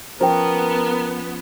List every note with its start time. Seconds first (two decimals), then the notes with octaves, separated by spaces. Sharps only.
0.21 F3 B3 C#4 A#4 C5 G5